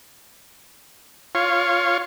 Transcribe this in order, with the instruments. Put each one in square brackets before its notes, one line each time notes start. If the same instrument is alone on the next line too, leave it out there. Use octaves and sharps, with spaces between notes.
[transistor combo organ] F4 C#5